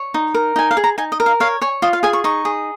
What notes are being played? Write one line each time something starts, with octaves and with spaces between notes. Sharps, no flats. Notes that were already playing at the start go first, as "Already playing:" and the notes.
Already playing: C#5
D#4
A#4
D#4 G#5
F5
G#4
A#5
D#4 G#5
D#5
A#4
F5
C#5 F5
C#5 G#5
F4 D#5
F5
G#4 G#5
C#6
D#4 C#6
G#4